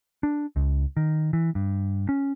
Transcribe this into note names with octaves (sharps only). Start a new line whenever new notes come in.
D4
C#2
D#3
E3
G2
C#4